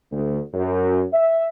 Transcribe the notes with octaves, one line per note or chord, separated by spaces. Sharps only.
D2
F#2
E5